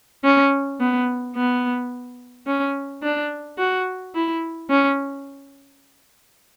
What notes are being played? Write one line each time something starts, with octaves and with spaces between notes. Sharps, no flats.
C#4
B3
B3
C#4
D4
F#4
E4
C#4